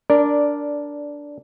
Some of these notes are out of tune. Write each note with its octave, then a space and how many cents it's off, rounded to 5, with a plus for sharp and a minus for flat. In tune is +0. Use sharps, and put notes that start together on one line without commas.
D4 -10 A#4 +0 D5 +0